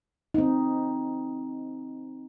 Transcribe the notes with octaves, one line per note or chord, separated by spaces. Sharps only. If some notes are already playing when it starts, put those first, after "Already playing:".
C4 D#4